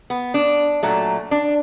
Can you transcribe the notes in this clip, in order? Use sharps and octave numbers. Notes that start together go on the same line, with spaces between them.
B3
D4
A#2 F#3 A3
D4